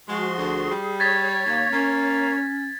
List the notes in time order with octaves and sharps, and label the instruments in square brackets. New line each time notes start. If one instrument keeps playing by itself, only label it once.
[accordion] F3 F#4 C6 [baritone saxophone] G#3 [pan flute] G#4
[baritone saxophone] D2
G3
[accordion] C#5 [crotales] G#6 A6 B6
[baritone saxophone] D#2 [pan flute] A#3
[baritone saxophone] A#3 [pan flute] C#4